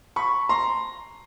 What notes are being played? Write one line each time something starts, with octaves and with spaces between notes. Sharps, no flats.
B5 C#6
A#5 C6